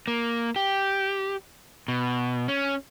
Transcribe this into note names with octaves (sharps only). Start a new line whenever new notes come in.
A#3
G4
B2
C#4